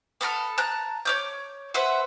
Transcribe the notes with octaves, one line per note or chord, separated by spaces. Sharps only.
B3 A4 A#5 F6
A5 A#5 F#6
C#5 D6 G6
B4 C5 E5 F#5